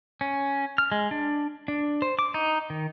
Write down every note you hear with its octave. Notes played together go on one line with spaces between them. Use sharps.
C#4
F6
G#3
D4
D4
C5
D6
D#4
D#3